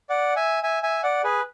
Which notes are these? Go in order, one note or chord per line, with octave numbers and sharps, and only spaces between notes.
D5 F#5
E5 G#5
E5 G#5
E5 G#5
D5 F#5
G#4 B4